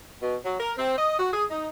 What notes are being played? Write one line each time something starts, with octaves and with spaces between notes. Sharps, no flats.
B2
F#3
A#4
C4
D#5
F#4
G#4
D#4